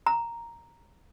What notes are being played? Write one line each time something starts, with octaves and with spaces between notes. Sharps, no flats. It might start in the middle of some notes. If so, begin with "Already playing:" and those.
A#5